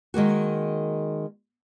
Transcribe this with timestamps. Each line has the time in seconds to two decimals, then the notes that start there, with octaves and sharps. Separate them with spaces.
0.14 D#3 G#3 A#3 F#4